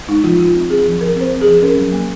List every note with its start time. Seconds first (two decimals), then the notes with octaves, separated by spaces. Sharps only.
0.09 G#3 D#4
0.24 F3 F4
0.39 F3 F4
0.54 C4
0.70 C4 G#4
0.85 F3
1.01 F3 A#4
1.16 C4 C5
1.32 C4
1.41 G#4
1.46 F3
1.62 C#4 A#4
1.77 F#3
1.92 A#3